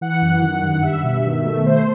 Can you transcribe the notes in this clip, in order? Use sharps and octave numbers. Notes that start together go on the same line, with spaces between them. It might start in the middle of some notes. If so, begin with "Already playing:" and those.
E3 F#5
F#2
D#3
G2
G3 E5
B2
D#3
A3
A3 C5